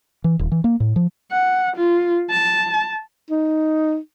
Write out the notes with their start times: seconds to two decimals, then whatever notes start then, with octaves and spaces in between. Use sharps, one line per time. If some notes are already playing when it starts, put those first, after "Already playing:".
0.24 E3
0.39 D#1
0.52 E3
0.64 A#3
0.80 A2
0.96 F3
1.32 F#5
1.77 F4
2.30 A5
3.30 D#4